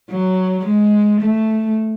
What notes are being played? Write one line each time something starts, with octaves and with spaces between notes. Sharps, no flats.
F#3
G#3
A3